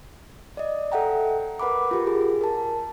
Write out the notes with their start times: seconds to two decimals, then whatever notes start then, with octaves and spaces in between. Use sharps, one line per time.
0.57 D5 D#5
0.92 A4 E5 F#5 G5 A#5
1.59 A#4 B4 F#5 B5 D6
1.91 F4 G4 A#4
2.07 G#4
2.41 A#4 A5